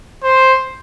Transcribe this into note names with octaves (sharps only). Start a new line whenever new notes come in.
C5